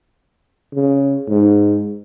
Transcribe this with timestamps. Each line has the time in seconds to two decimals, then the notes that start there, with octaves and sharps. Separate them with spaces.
0.74 C#3
1.28 G#2